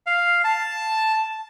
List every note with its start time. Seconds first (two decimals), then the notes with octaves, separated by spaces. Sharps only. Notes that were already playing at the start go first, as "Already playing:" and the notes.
0.06 F5
0.44 A5